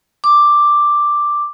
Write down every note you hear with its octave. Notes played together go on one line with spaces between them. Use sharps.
D6